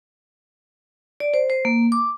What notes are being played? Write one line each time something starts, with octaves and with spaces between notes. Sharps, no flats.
D5
C5
C5
A#3
D6